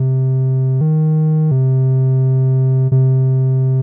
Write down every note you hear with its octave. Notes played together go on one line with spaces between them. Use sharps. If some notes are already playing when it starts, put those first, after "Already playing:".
Already playing: C3
D#3
C3
C3